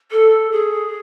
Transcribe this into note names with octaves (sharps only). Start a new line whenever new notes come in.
A4
G#4